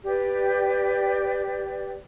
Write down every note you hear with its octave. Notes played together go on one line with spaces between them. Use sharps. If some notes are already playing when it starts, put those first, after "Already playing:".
G4 B4 D5 G5